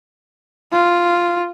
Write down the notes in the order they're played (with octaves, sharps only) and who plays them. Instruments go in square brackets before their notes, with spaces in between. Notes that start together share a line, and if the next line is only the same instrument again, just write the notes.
[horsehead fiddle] F4